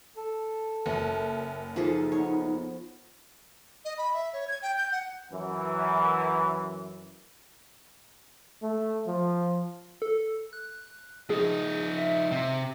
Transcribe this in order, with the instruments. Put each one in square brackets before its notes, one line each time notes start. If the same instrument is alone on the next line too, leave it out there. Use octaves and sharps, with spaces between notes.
[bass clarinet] A4
[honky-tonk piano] F#1 [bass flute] E5
[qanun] F3 G#4 A4 [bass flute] D#4
[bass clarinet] B3 [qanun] C#5
[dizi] D#5
B5
E5
C#5
G#6
G5
G6
F#5
[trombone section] F#2 E3
[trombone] A3
F3
[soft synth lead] A4
F#6
[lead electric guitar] F3 D#4 [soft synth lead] G#4
[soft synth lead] E5
[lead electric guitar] C3